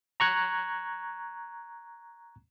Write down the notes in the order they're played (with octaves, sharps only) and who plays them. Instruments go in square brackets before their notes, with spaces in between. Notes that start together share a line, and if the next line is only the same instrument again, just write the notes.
[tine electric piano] A#5 C#6 F#6 G#6